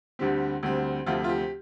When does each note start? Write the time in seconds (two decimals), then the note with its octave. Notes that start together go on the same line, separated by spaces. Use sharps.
0.19 D2 D3 G3 C4 G4
0.63 D2 D3 G3 C4
1.06 D2 C3 F3 A3 C4 F4
1.24 F4
1.29 G4